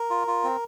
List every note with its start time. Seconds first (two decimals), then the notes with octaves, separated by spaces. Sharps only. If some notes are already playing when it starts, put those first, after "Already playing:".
Already playing: A#4
0.10 F4
0.27 F4
0.44 C4